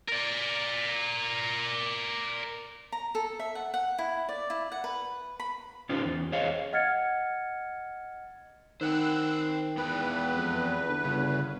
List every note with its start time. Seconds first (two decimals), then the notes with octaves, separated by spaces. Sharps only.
0.08 A#4 D5
2.92 A#5
3.15 A4
3.39 E5
3.55 F#5
3.74 F#5
3.98 E4
4.29 D5
4.50 E4
4.72 F#5
4.84 B4
5.40 B5
5.89 C#4 D#4 F4 G4 C5
6.05 E2
6.32 G#4 C5 C#5 D#5 F5
6.73 D#5 F#5 F6 G#6 A6 C#7
8.81 D#3 C5 F#5 G5 E6 F#6
9.77 E2 B3 E4 B4 G5
10.34 F2
10.88 D3
11.04 G1 C#3